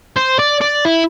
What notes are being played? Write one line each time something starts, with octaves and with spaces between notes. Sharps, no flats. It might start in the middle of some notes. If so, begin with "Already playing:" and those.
C5
D5
D5
E4